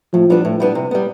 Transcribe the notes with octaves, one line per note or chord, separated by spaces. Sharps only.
A2 F3
G3 B3 D4
A2
G3 B3 D4
C3
G3 B3